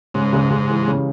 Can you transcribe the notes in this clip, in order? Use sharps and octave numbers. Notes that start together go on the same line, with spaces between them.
G#2 C#3
C#2
C#2
E3
C#3